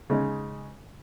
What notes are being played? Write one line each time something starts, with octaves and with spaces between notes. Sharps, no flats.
C#3 G#3 D#4